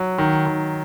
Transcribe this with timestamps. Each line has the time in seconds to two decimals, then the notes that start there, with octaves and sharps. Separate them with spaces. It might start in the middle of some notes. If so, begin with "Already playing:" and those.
Already playing: F#3
0.18 D#3
0.46 D#3